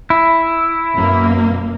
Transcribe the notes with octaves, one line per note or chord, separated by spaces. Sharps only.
E4
F#2 B2 A#3